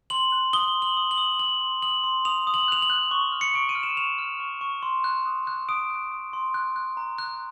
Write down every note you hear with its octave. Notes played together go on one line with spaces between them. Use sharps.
C6 F#7
F#6
D#6 G7
C6
F#7
D#6
F#7
D#6
D#6 F#7
C6
D#6 F#7
C6
D#6 F7
D#6
F#7
F#6 F7
F#7
F#6
C#6
F6
C#7
C#6 D7
D#7
F6
E7
C#6 F7
F6
C#6
C#6
C6
F#6
D#6
F#6
D#6 D7
F#6
D#6
C6
F#6
F#6
A#5
F#6